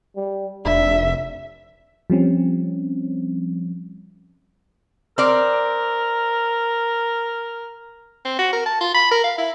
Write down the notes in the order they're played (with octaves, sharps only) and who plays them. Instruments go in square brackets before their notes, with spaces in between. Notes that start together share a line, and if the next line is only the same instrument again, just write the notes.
[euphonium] G3
[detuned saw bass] F1 [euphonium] D4 [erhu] E5
[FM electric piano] F3 G3 C4 C#4
[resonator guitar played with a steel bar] C4 D5 [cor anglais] A#4
[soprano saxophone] C4
F#4
A#4
A5
F4
B5
A#4
F5
E4